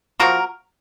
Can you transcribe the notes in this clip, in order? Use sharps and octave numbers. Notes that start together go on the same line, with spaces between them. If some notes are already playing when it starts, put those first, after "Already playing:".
F3 A#3 F#4 A#4